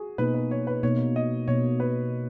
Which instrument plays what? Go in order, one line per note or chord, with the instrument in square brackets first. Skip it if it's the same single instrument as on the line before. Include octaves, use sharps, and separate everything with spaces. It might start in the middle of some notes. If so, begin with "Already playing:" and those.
Already playing: [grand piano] F#4 G#4
[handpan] B2 A#3 D#4 [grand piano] B4
[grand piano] B4
C#5
B4
[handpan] B2 A#3 D#4 [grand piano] C#5
[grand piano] D#5
[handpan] B2 A#3 D#4 [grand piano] C#5
[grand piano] B4